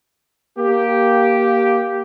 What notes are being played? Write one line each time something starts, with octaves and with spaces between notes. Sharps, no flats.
A#3 G4